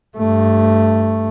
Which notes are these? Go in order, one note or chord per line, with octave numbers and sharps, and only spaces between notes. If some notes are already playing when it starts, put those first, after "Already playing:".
G2 A3